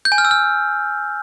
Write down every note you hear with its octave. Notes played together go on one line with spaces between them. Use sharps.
G6
G#5
F6
E6
F6